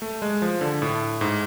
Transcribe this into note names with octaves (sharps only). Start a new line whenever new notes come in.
A3
G#3
F3
D3
A2
G#2